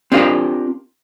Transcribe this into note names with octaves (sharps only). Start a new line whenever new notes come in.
C4 D4 F4 G4 A#4 F5